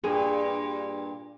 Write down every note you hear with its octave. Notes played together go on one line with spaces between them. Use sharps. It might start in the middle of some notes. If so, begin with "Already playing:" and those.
G2 A#2 G#4